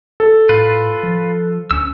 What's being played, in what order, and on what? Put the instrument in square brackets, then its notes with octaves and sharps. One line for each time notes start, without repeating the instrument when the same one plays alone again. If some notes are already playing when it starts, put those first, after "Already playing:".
[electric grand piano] A4
[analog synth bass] A2 [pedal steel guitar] F4 B4
[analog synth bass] F3
[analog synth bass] D2 [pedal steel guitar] C#4 E6